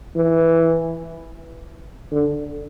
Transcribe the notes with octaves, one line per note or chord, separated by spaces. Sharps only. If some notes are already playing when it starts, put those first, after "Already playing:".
E3
D3